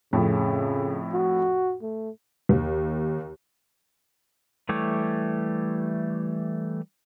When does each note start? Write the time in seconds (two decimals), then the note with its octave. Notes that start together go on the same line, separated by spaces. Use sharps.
0.13 F2 A2 C#3
1.12 F#4
1.82 A3
2.49 D#2
4.69 E3 G3 A3 G4 C#5